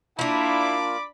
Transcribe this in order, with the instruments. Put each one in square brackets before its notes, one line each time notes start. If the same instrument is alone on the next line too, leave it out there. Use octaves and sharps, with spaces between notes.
[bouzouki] A#3 F4 [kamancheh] D4 A5 [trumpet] E4 [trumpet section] D5 B5 D6